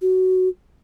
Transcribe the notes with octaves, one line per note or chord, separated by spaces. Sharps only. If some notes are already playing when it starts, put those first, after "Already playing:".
F#4